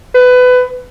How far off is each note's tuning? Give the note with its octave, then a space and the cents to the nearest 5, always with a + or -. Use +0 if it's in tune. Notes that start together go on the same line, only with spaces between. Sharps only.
B4 +20